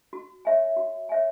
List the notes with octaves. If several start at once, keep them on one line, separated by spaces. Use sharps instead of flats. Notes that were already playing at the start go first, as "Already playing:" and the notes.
F#4
C#5 E5 G#5
F#4
C#5 E5 G#5